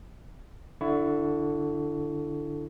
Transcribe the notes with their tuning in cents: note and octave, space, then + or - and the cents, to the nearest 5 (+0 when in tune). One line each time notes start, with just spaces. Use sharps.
D3 +0 E4 +20 C#6 +20